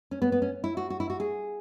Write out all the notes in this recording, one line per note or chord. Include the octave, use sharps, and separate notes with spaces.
C#4
B3
B3
C#4
E4
F#4
F#4
E4
F#4
G#4